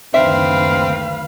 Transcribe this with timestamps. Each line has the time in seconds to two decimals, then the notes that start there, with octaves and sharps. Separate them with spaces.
0.14 F#1 D2 D#3 C4 B4 E5 F5